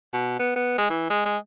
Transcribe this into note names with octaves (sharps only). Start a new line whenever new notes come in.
B2
B3
B3
G#3
E3
G#3
G#3